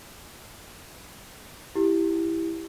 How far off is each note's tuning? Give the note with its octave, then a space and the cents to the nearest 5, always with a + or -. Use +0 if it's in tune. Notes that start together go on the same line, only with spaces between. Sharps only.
E4 +0 G4 +0